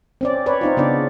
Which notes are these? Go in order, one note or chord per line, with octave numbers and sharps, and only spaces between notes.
C4 C#4 D5
B4 C#5 D5
C4 D#4 F4
C#3 B3 D4 D5